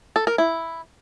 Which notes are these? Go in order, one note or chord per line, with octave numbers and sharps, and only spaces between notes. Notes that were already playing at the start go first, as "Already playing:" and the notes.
A4
A#4
E4